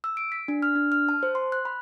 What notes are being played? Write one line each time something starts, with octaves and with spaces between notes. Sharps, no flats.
E6
D7
B6
D4
F6
D4
F6
A5
C5
C6
F#6
B5